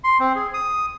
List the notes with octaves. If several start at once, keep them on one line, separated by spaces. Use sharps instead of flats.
C6
C4
G#4
D#6